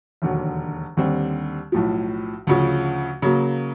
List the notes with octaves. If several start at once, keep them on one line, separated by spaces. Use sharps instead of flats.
E1 D#2 D3 F#3
D#2 D3 G3 C4
B1 A2 F3
D2 C#3 F3
C#3 F#3 A#3